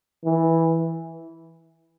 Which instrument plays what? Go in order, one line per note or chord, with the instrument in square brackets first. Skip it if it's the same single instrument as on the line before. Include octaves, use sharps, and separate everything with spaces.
[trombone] E3